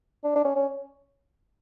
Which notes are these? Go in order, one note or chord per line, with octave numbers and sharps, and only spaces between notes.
D4
D4
C#4
C#4